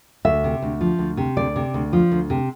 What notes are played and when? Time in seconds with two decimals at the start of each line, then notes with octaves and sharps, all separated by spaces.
0.25 D2 E5
0.44 C3
0.62 D2
0.81 F3
0.99 D2
1.17 C3
1.37 D2 D5
1.56 C3
1.74 D2
1.93 F3
2.12 D2
2.30 C3